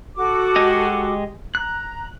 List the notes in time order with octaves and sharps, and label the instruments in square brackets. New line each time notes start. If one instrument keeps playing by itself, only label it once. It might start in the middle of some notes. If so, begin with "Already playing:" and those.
[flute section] F#4 A4 D6
[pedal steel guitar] G#3 G4 D#5
[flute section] A#5 [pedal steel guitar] F#6